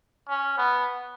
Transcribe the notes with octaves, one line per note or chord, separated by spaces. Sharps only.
C#4
B3